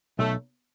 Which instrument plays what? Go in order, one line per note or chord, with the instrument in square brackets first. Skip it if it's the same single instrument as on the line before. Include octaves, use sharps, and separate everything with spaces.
[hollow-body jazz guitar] B1 [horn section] A3